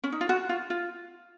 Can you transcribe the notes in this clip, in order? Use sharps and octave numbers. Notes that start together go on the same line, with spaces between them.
C#4
D#4
F4
F#4
F4
F4